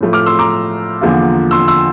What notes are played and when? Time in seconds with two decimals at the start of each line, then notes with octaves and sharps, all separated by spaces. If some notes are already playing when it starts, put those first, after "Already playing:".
0.01 A2 F3 A3
0.13 D6 F6
0.26 C6 E6
0.39 A#5 D6
1.01 E2 D3 F3 A#3 F4
1.51 C6 E6
1.68 C6 E6